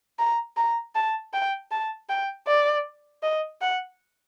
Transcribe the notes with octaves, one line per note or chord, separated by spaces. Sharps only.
A#5
A#5
A5
G5
A5
G5
D5
D#5
F#5